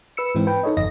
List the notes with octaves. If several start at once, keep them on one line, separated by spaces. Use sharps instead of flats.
B4 E6 C#7
G#2 E3 C4
B4 G5
D#4 A4 C#5 D#5
G1 F2 D#5 A#6